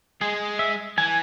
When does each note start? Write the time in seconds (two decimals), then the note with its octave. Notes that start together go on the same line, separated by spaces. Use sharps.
0.21 G#3 G#4
0.59 E5
0.98 E3 G#5